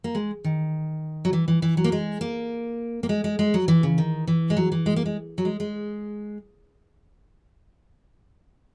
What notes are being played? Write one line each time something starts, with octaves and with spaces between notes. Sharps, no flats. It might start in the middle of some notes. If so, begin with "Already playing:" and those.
A#3
G#3
D#3
F#3
E3
E3
E3
F#3
A#3
G#3
A#3
A#3
G#3
G#3
G#3
F#3
E3
C#3
D#3
E3
G#3
F#3
E3
G#3
A#3
G#3
F#3
G#3
G#3